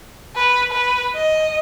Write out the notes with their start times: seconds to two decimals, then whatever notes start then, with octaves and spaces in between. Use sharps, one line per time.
0.36 B4
0.71 B4
1.15 D#5